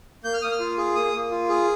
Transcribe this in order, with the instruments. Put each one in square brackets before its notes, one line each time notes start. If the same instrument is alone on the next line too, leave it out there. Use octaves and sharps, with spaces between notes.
[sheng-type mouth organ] A#3 G6
F6
A#3 D#6
F6
F4
G#4
A#3 D#6
A#3
F4
G#4